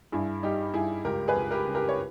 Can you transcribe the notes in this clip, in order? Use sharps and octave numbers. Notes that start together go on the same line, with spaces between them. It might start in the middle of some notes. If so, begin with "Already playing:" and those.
G2 E4 G#4
G3 D#4 G4
G2 E4 G#4
C#2 G4 A#4
G#4 B4
C#2
G4 A#4
C#3
G4 A#4
C#5